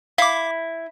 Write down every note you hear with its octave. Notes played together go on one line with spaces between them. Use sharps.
E4 F5 D6